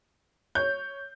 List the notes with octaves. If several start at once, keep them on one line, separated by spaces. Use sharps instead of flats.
C#5 G6